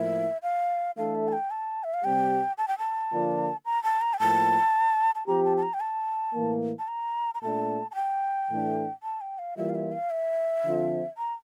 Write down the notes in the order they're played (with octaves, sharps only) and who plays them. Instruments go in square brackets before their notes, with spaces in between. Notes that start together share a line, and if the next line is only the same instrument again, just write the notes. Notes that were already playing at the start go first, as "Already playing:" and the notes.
Already playing: [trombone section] A2 F3 A#3 E4 [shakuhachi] E5
[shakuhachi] F5
[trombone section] E3 A3 D4 A4 [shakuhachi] F5
[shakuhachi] E5
A5
G5
A5
E5
F5
[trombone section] C3 G3 C4 G4 [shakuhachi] G5
[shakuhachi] A5
G5
A5
[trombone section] D3 F3 A#3 D4 F4
[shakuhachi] A#5
A5
A#5
G5
[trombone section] A2 F3 A#3 [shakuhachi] A5
[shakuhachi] A5
[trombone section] F3 C4 G4 [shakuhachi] A#5
[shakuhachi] A5
A5
A#5
G5
A5
[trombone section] A2 E3 A#3
[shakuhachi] A5
A#5
A#5
[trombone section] A#2 A3 D4 [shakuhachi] A5
[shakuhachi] A5
G5
[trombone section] A2 E3 A3 D4
[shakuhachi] A5
G5
F5
[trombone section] E3 G3 A#3 F4 [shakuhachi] E5
[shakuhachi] F5
E5
F5
E5
[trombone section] D3 F3 C4 F4 A4
[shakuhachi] A#5